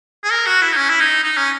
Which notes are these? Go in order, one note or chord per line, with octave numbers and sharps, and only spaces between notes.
G#4
A#4
F#4
E4
D#4
C#4
E4
D#4
D#4
C#4